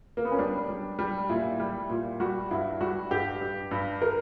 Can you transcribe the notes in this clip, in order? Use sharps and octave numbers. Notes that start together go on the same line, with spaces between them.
A#3
B3
C#4
G3 D4
G3
G3
A#2 E4
G3
A#2
G3 F#4
G2 E4
G3 F#4
G2 G4
G2
G2
A#4